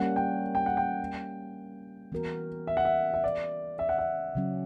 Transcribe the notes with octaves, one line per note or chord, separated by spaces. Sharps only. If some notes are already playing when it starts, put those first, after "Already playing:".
Already playing: G3 A#3 C#4 F#5
G5
G5
F#5
G5
E3 B3 F#4 A#4
E5
F#5
E5
E5
D5
E5
F#5
E5
C#3 F#3 C#4